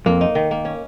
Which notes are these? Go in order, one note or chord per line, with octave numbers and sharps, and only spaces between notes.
F2 A#3
D#4
D#3
A#3
C#4